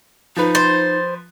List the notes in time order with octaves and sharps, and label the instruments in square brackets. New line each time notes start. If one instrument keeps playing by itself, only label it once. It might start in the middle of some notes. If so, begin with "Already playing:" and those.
[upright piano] F3 B4 [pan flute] D#4
[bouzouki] C5 [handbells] A6